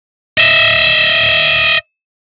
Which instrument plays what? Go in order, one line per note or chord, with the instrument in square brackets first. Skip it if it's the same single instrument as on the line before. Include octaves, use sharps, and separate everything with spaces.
[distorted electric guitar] D#5 E5